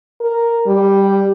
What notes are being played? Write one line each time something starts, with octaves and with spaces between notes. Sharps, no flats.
A#4
G3